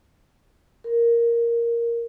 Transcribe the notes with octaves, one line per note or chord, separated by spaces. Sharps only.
A#4